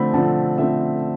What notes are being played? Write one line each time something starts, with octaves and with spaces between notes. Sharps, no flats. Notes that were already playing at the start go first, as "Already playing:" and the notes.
Already playing: D3 F3 A3 C4 B5
D3 F3 A3 C4 A5
D3 F3 A3 C4 E5